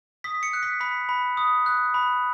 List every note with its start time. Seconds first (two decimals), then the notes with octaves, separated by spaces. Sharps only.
0.24 D#6 B6
0.43 C#7
0.53 F#6
0.63 B6
0.80 B5 B6
1.09 B5
1.37 D#6
1.66 F#6
1.94 B5